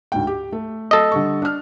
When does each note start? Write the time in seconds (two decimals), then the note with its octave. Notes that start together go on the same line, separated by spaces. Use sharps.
0.12 D2 G#2 G5
0.27 G4
0.52 A3
0.91 A4 D#5
1.12 D3 G3 C#6
1.42 D4 F6